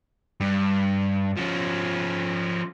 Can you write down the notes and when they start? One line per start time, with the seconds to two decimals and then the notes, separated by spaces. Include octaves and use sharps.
0.40 G2
1.37 F3 C#4